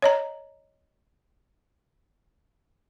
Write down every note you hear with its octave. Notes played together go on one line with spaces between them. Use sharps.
C#5 D#5 A#5